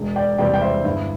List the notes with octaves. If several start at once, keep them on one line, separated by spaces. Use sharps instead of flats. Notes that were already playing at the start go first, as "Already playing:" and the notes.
Already playing: E1
D5 G5
E2 C3 G3 C4 D5 G5
G5
C5 E5
G1 E4